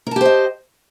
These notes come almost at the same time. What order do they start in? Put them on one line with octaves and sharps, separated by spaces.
A#4 A5 G4 C5 D#5